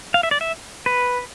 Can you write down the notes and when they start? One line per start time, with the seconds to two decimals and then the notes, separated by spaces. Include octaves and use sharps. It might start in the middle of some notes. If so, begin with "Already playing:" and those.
0.14 F5
0.23 E5
0.31 D5
0.41 E5
0.86 B4